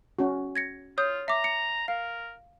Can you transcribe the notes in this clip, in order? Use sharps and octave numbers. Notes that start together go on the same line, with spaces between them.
C#4 F#4
G#6 A#6 C#7
F4 C#5 D#6 G6
E5 A#5 D6
C#7
A#4 F5